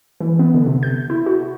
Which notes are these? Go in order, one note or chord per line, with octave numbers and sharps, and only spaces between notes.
E3
B3
D3
C3
G6
E4
F#4